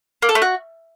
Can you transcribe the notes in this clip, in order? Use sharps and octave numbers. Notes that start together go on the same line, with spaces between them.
A#3
A4
A3
F#4